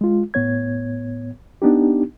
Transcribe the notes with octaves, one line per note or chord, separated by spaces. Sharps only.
G#3 F4
A2 B3 C#5 G#6
B3 D4 D#4 G4